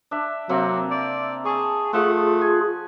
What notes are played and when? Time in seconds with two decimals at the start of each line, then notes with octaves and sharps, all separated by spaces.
0.11 D4 E5
0.49 C3 F#3 A#3 C4
0.91 D5
1.45 G#4 A5 C#6
1.93 F3 A3 F4 G#4 F#5
2.41 G#5